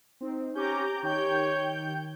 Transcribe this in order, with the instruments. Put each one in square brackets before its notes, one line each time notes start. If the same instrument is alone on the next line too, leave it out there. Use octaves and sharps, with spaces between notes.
[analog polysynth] C4 D#4
[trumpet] C#4 [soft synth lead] G4 [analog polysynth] A#5 D6 G6
[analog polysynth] D#3 G5 G6 [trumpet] C#5